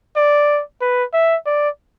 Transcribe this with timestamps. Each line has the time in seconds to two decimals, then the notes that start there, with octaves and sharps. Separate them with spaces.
0.16 D5
0.81 B4
1.14 E5
1.46 D5